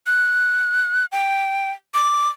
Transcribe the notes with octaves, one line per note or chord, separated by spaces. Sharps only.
F#6
G5
D6